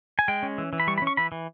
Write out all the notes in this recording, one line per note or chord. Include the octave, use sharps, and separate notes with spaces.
G#5
G#3 G5
C#4
E3
E3
B5
G3 C#6
B5
C#4
C#6
E3 B5
E3